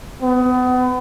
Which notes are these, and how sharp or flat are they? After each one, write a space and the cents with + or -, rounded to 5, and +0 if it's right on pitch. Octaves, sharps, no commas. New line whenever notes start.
B3 +30